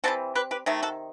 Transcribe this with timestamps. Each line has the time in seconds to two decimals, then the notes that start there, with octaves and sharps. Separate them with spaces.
0.04 E3 G3 C4 F#4 A4
0.35 G4 B4
0.51 G4 B4
0.66 C3 D#3 A3
0.83 F#4 A4